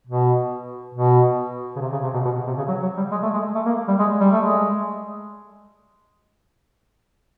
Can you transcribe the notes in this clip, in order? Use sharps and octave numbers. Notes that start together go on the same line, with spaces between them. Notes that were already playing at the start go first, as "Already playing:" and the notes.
B2
B2
C#3
C3
C#3
C3
B2
B2
B2
C3
C#3
F#3
F#3
G3
G#3
A3
G#3
A3
A#3
G3
G#3
G3
A3
G#3